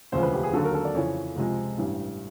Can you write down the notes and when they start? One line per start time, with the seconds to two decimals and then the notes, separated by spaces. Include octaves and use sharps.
0.12 E1 D2 C#3 F3 C5
0.22 B4
0.33 G4
0.43 G#4
0.53 D#2 D3 F#3 A4
0.64 A#4
0.74 A4
0.85 D5
0.95 F2 C#3 E3 C#5
1.36 C#2 C3 F3 G#3
1.78 A1 G2 E3 G3